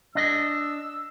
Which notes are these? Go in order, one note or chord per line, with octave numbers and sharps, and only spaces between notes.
D4 D#5 E6